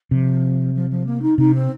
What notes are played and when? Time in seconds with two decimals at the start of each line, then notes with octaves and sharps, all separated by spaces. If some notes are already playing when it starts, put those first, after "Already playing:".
0.11 C3 F3
0.74 F3
0.90 F3
1.06 A#3
1.22 D#4
1.38 C3 D#4
1.54 C4